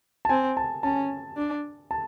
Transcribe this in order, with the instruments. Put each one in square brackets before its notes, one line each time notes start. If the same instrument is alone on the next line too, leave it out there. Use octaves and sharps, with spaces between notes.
[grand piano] A5
[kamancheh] C4 [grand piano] G#5
[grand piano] A5
[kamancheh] C#4 [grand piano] A5
[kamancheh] D4
[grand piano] A5